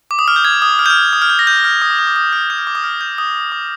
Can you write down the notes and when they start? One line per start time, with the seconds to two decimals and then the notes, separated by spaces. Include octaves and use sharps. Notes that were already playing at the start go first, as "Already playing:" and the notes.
0.11 D6
0.19 D#6
0.28 F6
0.36 G6
0.45 G#6
0.62 D#6
0.79 F6
0.86 G6
0.90 F6
1.13 D#6
1.22 F6
1.30 G6
1.39 A#6
1.47 G6
1.65 F6
1.82 D#6
1.90 D6
1.99 D#6
2.07 D6
2.16 D#6
2.33 F6
2.50 G6
2.58 F6
2.67 D6
2.75 D#6
2.84 F6
3.01 G6
3.18 D#6
3.52 D6